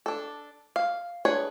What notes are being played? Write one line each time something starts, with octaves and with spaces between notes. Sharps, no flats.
D4 A4
F5
D4 G#4 B4 C#5